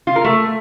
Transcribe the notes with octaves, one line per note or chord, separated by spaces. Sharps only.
F4
A#4
A3